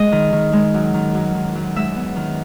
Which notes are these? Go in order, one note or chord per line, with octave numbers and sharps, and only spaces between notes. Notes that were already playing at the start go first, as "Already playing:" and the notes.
Already playing: G#3 D#5
D#3
D#3
G#3
F#2
D#3
F#2
D#3
F#2
G#3 E5
B3
D#3